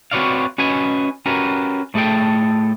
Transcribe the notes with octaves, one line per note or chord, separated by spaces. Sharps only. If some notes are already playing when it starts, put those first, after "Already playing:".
C4 F#4 B4 C#5 D5 F5
C#4 F#4 B4 D#5 G#5
C#4 F#4 G4 A#4 B4
A2 A3 G#4 A4 G5